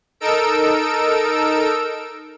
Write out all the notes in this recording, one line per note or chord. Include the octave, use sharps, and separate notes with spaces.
D#4 A4 A#4 E6 D7